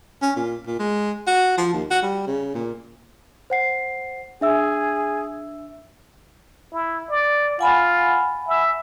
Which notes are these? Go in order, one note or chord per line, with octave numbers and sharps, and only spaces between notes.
C#4
A#2
A#2
G#3
F#4
F3
D#2
F#4
G3
C#3
A#2
C5 F#5 C7
D4 G#4 E5 E6
E4
D5
F4 F#5 G#5 B5
E5